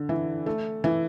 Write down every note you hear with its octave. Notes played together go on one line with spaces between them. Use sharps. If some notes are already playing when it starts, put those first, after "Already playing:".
Already playing: D3
E3
A3
E3